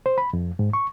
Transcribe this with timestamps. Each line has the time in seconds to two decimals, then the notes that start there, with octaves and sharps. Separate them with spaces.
0.06 C5
0.18 B5
0.33 F2
0.59 G#2
0.73 C#6